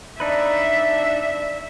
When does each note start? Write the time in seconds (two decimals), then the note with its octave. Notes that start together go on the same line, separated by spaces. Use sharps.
0.20 D4 D#4 B4 D5 E5